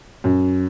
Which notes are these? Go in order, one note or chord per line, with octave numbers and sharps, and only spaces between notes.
F#2